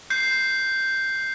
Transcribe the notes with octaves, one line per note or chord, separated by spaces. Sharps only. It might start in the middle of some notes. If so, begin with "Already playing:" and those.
G6 C7